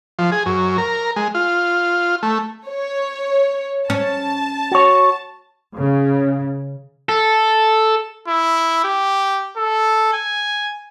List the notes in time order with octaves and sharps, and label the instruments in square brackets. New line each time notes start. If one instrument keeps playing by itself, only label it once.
[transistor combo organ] F3
G#4
F#2
A#4
G#3
F4
A3
[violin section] C#5
[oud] C#4 [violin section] A5
[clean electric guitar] F#4 C#5
[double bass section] C#3
[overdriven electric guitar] A4
[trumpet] E4
G4
A4
G#5